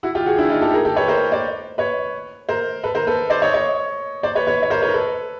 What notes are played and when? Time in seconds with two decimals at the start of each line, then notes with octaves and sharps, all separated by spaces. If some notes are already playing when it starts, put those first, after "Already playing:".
0.03 E4 F#4
0.15 F4 G4
0.26 F#4 G#4
0.38 D4 E4
0.50 D#4 F4
0.61 G4 A4
0.73 G#4 A#4
0.85 G4 A4
0.96 B4 C#5
1.08 A#4 C5
1.32 C5 D5
1.78 B4 C#5
2.49 A#4 C5
2.83 A4 B4
2.95 A#4 C5
3.07 A4 B4
3.30 C5 D5
3.42 C#5 D#5
3.54 C#5 D#5
4.23 C5 D5
4.35 B4 C#5
4.47 B4 C#5
4.63 C#5
4.70 A#4 C5
4.82 B4 C#5
4.88 A#4
4.94 A4 B4